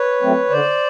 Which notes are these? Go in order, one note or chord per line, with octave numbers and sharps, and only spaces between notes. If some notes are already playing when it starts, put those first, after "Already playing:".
Already playing: B4 C#5
F#3 A3 C4
D3 C5 D5